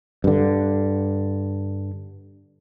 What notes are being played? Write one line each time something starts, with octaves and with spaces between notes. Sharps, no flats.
G2 D3